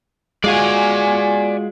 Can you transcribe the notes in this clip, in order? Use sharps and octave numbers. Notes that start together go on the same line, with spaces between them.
G#3 F4 F#4 D5 G#5